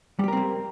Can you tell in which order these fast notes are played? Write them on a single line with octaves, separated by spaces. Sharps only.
G3 G4 A#4 C4 A#3